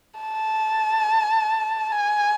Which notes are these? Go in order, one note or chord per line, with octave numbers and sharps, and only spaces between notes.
A5
G#5